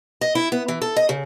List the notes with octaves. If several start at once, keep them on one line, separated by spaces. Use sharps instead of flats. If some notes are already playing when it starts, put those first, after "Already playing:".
D#5
E4
B3
E3
A4
D#5
C#3